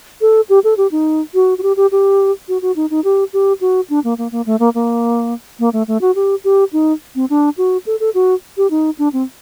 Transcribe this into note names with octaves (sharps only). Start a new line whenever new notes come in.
A4
G4
A4
G4
D#4
F#4
F#4
G4
G4
G4
F#4
F#4
D#4
D#4
G4
G4
F#4
D4
A#3
A#3
A#3
A3
A#3
A#3
A#3
A3
A3
F#4
G4
G4
D#4
C4
D4
F#4
A4
A4
F#4
G4
D#4
D4
C4